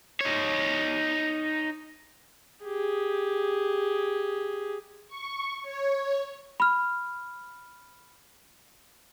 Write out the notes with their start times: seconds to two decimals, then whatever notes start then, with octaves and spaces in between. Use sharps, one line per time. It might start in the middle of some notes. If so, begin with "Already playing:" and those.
0.21 D#4 C#5
2.64 G4 G#4
5.08 C#6
5.62 C#5
6.60 B5 F6